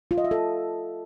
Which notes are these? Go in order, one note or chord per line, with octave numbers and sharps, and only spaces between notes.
F4
D#5
E5
A4